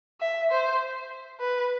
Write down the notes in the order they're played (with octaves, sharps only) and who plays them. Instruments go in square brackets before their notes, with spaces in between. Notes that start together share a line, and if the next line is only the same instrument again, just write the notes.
[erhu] E5
C5
B4